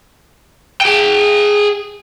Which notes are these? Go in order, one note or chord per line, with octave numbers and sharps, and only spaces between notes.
G#4 G5